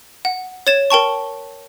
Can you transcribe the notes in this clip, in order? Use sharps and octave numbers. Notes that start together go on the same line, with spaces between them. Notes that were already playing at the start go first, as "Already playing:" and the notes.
F#5
C#5 G#6 A6 E7
A#4 G5 A5 C#6